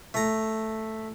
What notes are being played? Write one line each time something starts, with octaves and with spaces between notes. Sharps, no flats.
A3 A#5